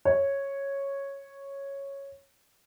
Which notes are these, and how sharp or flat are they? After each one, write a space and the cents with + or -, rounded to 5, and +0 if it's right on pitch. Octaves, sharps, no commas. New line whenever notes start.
C#5 -5